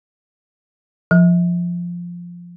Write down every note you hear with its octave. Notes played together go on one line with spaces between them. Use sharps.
F3